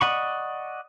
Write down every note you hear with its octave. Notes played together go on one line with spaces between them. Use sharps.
D5 D#5 F#5 B5 C#6